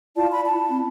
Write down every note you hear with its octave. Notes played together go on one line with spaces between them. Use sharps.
E4 F4 D5 A5
B5
A5
C4